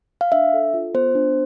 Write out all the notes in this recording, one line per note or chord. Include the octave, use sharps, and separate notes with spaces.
F5
D4 E5
A4
F4
B3 C5
D4